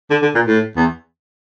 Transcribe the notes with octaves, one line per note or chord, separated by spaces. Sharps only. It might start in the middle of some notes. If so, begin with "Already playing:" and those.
D3
D3
A#2
A2
E2